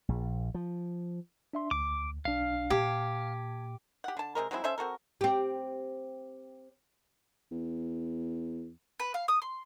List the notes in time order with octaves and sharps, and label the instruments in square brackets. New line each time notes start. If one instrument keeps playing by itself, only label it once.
[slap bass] A#1
F3
[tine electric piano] D4 E5 C6
[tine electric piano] D2 [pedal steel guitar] D6
[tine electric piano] B1 D4 [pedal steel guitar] F5
[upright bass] A#2 [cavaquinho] G4 [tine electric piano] A5 G#6
[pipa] G4 F#5
D3 A5
C3 F#3 G#3 A#4
F#3 G#3 C4 E4
C#4 A4 C5 E5
C4 F#4 A4 A#4
[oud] C4 G4
[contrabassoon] E2
[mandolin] B4
F5
D#6
C6